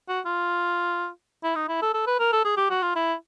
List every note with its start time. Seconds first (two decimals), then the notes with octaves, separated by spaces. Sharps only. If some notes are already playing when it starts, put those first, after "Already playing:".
0.08 F#4
0.25 F4
1.44 E4
1.56 D#4
1.69 E4
1.82 A4
1.94 A4
2.07 B4
2.19 A#4
2.33 A4
2.45 G#4
2.57 G4
2.70 F#4
2.82 F4
2.96 E4